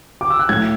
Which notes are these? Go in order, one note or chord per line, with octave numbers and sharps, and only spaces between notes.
D6
E6
F#6
A2 G#6